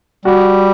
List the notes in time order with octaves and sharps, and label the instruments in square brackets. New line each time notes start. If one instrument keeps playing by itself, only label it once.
[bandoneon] G3 [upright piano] F#4